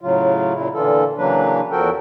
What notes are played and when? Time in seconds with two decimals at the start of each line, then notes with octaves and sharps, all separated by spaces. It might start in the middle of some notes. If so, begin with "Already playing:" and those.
0.01 A2 C#3 F#3 F4
0.54 A#2 C#3 E4
0.74 A#2 D3 E3 F4 A4
1.17 C#3 E3 F#3 A#3 D4 B4
1.71 E2 F3 F#4 A4 A#4 G5